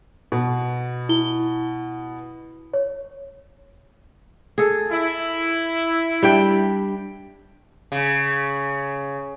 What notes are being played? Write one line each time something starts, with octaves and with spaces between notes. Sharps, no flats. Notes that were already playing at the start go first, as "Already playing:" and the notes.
B2
E4 G7
C#5
G#4 A4
E4
G3 D4 G5
C#3